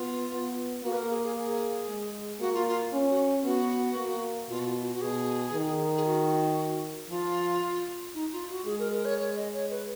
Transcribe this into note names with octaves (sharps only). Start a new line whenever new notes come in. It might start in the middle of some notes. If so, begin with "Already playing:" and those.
Already playing: B3 F4
B3
A#3 F#4
B4
A#4
G#4
G#4
G#4
G#3
A#3 F#4
F4
F4
C#4
F#4
B3 F#4
A#3
B2 F4
F#4
F4
F#4
F#4
B2 G#4
D#3
G#4
F#4
F3 F4
D#4
F4
F#4
G#3 G#4
A#4
A#4
C#5
C#5
D#5
C#5
B4